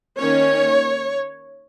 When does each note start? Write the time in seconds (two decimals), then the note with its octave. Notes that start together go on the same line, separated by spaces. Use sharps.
0.18 D#3 A#3 C#4 C#5